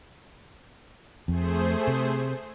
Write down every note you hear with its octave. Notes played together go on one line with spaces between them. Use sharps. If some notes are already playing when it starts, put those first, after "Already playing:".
F2 A3 G#4 C5
C3